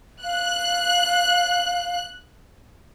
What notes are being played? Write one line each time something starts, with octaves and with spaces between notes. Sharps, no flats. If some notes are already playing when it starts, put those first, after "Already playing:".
F5 F#6